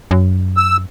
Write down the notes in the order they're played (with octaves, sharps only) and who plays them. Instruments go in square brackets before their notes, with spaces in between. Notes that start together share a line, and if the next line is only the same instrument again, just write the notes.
[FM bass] F#2
[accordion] E6